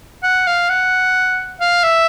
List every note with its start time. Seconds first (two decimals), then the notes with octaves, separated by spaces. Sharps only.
0.23 F#5
0.47 F5
0.69 F#5
1.61 F5
1.83 E5